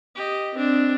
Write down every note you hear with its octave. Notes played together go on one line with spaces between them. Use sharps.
G4 D#5
C4 D4